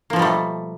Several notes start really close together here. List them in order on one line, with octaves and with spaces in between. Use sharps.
A#3 F3 B2 G3 A3